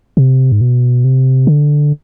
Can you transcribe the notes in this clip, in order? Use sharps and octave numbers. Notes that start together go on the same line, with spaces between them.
C3
G#2
B2
C3
D3